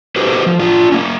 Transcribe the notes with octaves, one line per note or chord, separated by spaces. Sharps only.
D#4 F#4 G4 A4 B4 C5
F3
D4 F4
A#3 C#4